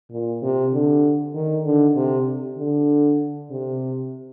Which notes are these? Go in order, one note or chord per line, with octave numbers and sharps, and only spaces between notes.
A#2
C3
D3
D#3
D3
C3
D3
C3